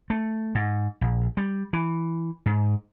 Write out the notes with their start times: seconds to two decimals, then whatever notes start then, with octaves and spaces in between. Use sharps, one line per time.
0.10 A3
0.55 G#2
1.01 A#1
1.37 G3
1.73 E3
2.46 G#2